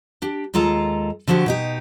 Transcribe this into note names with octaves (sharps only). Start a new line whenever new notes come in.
D4 G4
D#2 G#3 F4 A4 A#5
D3 F3 F#3 F#4 G4
B2 D#4 G4